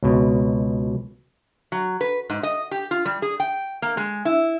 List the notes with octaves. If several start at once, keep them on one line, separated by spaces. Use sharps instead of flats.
C#2 B2
F#3
B4
G#2
D#5
G4
F4
G3
G#4
G5
A#3
G#3
E4